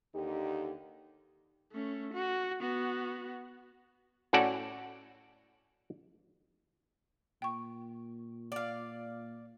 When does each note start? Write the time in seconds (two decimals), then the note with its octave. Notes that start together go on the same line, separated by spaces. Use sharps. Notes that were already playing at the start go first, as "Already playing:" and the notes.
0.15 D#2 D3 D#4 G4
1.73 A3 C#4
2.13 F#4
2.61 B3 F#4
4.33 A2 C#4 F#4 A4 D5 F#5
7.42 A#2 G5 C#6
8.52 D5 F5